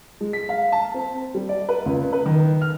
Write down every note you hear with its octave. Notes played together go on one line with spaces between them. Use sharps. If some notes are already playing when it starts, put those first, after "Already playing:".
G#3
B6
F5
A5
C4
G3
D5
B4
C#2
B4
D#3
F6